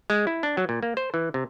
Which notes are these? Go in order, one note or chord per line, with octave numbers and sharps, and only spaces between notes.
G#3
E4
D4
F#3
A#2
A#3
C5
E3
C3